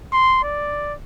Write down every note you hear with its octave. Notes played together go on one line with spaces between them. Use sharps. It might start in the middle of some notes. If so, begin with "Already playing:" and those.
C6
D5